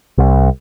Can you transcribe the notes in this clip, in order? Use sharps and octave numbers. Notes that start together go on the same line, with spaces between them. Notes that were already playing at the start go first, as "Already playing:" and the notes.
C2